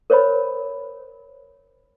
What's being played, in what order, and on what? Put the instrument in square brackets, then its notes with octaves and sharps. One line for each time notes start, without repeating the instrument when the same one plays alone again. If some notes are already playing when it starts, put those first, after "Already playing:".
[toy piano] A#4 C5 C#5 D#5 B5